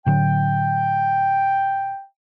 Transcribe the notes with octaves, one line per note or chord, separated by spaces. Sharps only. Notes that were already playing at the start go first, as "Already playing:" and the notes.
A2 D3 F#3 G5